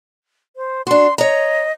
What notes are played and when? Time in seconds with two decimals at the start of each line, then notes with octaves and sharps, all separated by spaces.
0.56 C5
0.87 D4 F#4 C6
1.18 C#5 D#5 A#5